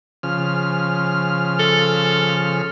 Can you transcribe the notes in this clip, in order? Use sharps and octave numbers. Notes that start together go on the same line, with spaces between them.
C#3 F3 F6
A4